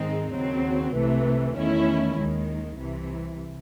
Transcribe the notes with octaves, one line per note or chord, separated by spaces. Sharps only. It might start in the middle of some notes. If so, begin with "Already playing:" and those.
Already playing: G#2 D#3 G#3 C4 D#4
D#2 C#3 F#3 C4
C2 C3 E3 A3
E2 D#3 A3 C#4 E4
D#2 D#3 G#3
C2 C3 E3